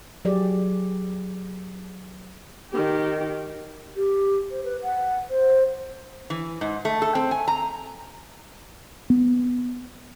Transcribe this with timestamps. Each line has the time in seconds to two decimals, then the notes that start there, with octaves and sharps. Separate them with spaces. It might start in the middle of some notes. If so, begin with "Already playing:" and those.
0.25 F#3 G4 G#4 D5
2.71 D#3 G4
3.97 G4
4.51 C5
4.64 B4
4.83 F#5
5.30 C5
6.30 E3
6.61 G#2
6.85 A3
7.02 A4
7.15 C4
7.31 G#5
7.48 A#5
9.10 B3